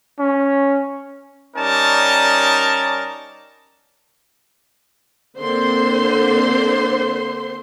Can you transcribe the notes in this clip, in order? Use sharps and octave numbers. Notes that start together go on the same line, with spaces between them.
C#4
G3 C#4 D#4 A#4 D5 A5
D3 A#3 C4 C5 C6